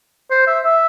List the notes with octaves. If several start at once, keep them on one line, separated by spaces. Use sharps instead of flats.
C5
E5
E5